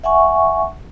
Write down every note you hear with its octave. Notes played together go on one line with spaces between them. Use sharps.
E5 F#5 G#5 C#6